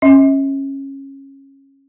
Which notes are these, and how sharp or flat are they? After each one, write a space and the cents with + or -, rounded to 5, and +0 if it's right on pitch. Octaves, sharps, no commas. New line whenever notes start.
C#4 -20 E5 -45